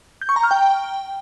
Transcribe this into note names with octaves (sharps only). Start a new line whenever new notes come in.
G6
C#6
A#5
F6
G5